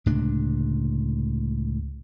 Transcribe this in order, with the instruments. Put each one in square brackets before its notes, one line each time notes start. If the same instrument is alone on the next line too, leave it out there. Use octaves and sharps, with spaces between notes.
[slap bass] C#2 A2 C3 D4